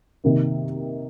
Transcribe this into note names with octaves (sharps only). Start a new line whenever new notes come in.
C3 D#3 A#3